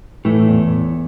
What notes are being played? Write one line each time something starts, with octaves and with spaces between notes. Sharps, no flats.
A2 E3 A3
E2